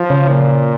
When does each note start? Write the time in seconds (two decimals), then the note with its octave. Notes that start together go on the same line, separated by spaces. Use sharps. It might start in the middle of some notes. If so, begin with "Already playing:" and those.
Already playing: F3
0.10 C#3
0.29 A#2